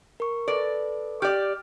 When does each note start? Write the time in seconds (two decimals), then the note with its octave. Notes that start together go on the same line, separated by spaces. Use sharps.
0.20 A#4 C#6
0.48 A4 B4 D5
1.22 G4 D5 F6